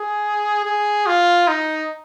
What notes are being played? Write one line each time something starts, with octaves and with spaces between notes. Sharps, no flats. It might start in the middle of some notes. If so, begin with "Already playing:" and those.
Already playing: G#4
G#4
F4
D#4